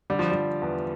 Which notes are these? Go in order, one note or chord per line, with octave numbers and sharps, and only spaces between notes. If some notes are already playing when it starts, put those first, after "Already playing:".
D3 G3
F3
F3 G3
E2